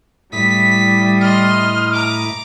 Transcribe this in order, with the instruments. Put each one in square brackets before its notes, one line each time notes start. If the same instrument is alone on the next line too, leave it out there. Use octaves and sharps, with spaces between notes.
[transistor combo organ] A2 E4 D#6 [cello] G3 [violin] B6
[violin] D#5 C6 [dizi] F6
[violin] A#5 D6